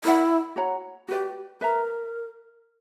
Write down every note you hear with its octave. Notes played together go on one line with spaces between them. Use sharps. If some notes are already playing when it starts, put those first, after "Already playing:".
E4 A#4 D5 F#5
F#4 C#5 F#5 A#5
F#4 G4 B4 D5
A#4 B4 E5 A#5